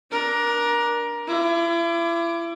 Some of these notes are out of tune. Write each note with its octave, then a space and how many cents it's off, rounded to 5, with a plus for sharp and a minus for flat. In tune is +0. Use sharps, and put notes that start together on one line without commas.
D4 +0 A#4 +20
E4 +40 D6 +0